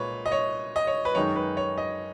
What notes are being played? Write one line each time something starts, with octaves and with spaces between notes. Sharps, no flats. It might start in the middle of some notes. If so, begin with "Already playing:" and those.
Already playing: A#2 G#3 B4 C#5
D#5
C#5
D#5
C#5
B4
F#2 D#3 G#3 D#4 C#5
B4
C#5
D#5